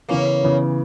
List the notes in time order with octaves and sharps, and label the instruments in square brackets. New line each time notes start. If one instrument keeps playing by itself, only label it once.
[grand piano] C#3 E3 B3 [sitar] A#3 C#4
[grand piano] C#3 E3 B3